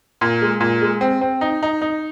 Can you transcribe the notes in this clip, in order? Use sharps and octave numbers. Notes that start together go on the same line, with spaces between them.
A#2
G#3
A#2
G#3
C4
C4
D#4
D#4
D#4